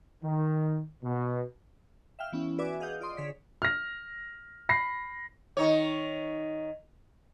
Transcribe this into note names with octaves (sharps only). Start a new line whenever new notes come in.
D#3
B2
E5 F5 G5 F6
E3 B3 C#4 E4
F#4 B4 D5 E5 G#5 D6
G#4 D#5 F5 F#5 D#6 G6
F4 D5 D#5 C6 D#6
D3 G#4 C#5 D5 B6
F6 A#6
B5 A#6 C7
D#3 D#4 C#5